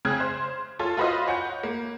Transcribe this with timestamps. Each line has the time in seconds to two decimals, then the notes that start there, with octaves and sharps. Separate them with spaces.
0.05 C#3 C4 G#4 F6 F#6 G#6
0.20 C5
0.79 F4 A4 C#5
0.97 F4 F#4 B4 C5 D#5 F5
1.27 C#5 F#5 G6
1.63 A#3